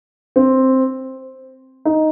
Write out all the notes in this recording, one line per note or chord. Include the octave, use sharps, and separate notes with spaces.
C4
D#4